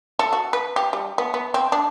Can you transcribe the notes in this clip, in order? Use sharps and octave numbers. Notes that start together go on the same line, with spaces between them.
A4
F#4
B4
G4
G3
B3
B3
C4
D4